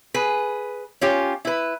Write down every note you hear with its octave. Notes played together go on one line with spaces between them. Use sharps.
G#4 B4
C#4 F4 G4
E4 B4